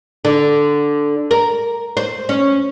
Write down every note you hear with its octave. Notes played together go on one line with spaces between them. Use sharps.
D3
A#4
C5
C#4